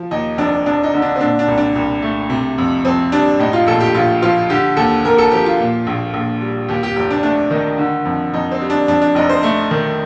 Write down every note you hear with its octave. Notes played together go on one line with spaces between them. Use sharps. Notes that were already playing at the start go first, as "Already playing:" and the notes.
Already playing: F3
D#2 D#4
F1 D4
F1 D4
D#4
D3
D4
C4
A#2 D4
D4
C2
D4
C2
A3
C3
F2
F2 C4
G3 D4
A2 D#4
F4
A#1 A4
G4
A#1 F4
F3 F4
D3 G4
D#2 A4
D#2 A#4
A4
F3 G4
F4
A#2
A#1
A#1
G3
D#2 G4
G4
F1 G4
D4
A3 D4
D#3 D#4
D3
F2
F2 D#4
C4
G3
D4
F2 D4
D4
F1 D#4
C5
A3
D#3